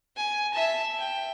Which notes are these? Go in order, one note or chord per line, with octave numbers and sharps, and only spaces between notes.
G#5
E5 A5
G5